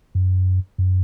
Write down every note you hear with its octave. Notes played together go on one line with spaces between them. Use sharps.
F#2
F#2